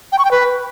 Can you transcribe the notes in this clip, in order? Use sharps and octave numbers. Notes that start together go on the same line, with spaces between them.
G5
C#6
G5
B4